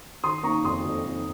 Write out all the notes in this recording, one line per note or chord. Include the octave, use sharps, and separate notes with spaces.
D#3 C6 D#6
A#3 A#5 C#6
F2 C6 D#6
F2
F2